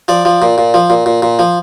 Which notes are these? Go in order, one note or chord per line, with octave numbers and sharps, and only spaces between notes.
F3 D5
F3
A#2
A#2
F3
A#2
A#2
A#2
F3